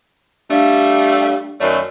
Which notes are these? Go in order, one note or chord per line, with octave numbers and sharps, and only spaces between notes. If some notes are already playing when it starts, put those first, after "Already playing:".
G3 A3 D4 F5
F#2 D#3 A3 C#5 D5